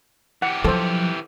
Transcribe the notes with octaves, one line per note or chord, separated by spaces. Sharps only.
E3 G4 F#5
F3 F#3 A4 C5